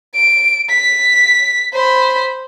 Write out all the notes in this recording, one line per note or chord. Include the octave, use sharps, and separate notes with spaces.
D7
B6
C5 B5